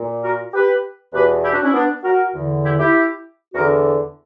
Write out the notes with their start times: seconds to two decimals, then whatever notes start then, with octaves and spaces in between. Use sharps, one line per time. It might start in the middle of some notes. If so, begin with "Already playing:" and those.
Already playing: A#2
0.23 F#4 A#4
0.54 G4 B4
1.13 E2 B2 G4 B4
1.44 E4 G4
1.53 D4 F#4
1.64 C#4 E4
1.73 B3 D4
2.04 F#4 A#4
2.34 E2 D3
2.63 E4 G4
2.79 E4 G4
3.54 E2 D3 F#4 A#4